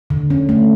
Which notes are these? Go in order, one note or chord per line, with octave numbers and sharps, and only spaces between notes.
D3
C#4
A3